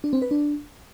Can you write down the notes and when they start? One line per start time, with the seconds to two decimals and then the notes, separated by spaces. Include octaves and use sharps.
0.04 D4
0.13 C4
0.22 B4
0.31 D4